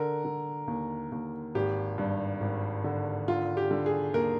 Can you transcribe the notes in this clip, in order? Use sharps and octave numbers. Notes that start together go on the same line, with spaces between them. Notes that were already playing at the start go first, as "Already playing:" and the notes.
Already playing: D3 A#4
D3
D#2
D#2
G#1 G4
G2
G#1
D3
D3 F4
G4
D3
G#4
D#2 A#4